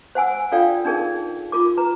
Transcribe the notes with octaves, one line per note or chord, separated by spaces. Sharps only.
C5 F#5 G#5 E6
D4 F4 A4 D5 F5 G5
D4 D#4 G#4 A#4
F4 A#4 D6
B4 A#5